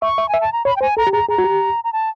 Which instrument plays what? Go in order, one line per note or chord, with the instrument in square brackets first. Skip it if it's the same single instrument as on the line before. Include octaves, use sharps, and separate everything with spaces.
[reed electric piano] E5 [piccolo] C#6
[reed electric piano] E5
[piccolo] G#5
[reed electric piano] E5
[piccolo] A5
A#5
[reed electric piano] C#5 [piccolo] B5
[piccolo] G5
[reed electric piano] C5 [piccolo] G#5
[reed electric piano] A4 [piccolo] A#5
[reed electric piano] G4
[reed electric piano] G#4 [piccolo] A#5
[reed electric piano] G#4 [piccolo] A#5
[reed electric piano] F#4
G4
[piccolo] A#5
A5